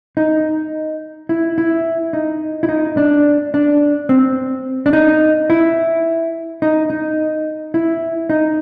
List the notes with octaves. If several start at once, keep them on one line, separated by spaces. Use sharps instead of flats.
D#4
E4
E4
D#4
E4
D#4
D4
D4
C4
D4
D#4
E4
D#4
D#4
E4
D#4